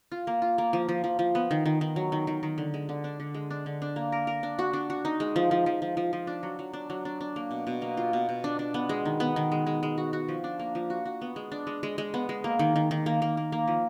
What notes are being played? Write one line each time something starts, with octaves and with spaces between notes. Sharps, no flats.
F4
A#3
F4
A#3
F3
F3
F3
F3
B3
D#3
D#3
D#3
F#3
D#3
D#3
D#3
D3
G#3
D3
D4
D3
G#3
D4
D3
D4
A#3
A#4
A#4
D4
F#4
D4
F#4
D#4
G#3
F3
F3
F3
F3
F3
F3
D4
F#3
F#3
D4
F#3
D4
D4
A#3
B2
B2
A#3
F4
B2
B2
D4
D4
B3
G#3
D#3
B3
D#3
G#3
G#3
G#3
F#4
F#4
F3
D4
A#3
F3
F#4
F#4
B3
G#3
D4
G#3
G#3
G#3
B3
G#3
A#3
D#3
D#3
D#3
A#3
A#3
A#3
A#3
F3